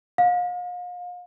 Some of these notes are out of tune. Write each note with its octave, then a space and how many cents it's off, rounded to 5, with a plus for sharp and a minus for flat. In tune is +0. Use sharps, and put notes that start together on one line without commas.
F5 +40